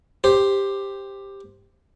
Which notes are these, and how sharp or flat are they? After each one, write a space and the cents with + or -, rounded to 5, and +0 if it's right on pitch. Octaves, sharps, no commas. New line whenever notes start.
G4 +10 C5 +0